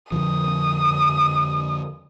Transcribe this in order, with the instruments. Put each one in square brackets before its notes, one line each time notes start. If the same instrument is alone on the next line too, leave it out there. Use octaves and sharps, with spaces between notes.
[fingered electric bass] F2 D3 F3 [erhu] D#6